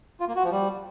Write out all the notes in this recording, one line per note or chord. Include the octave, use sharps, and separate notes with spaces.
F4
A#3
F#4
F3
G3